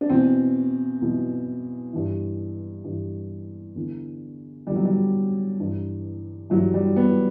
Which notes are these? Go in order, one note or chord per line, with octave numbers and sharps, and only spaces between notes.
D4
E2 B2 C4
E2 B2
G2 E3
G2 E3
E2 D3
E2 D3 G3
F#3
G3
G2 E3
G2 E3 F#3
G3
B3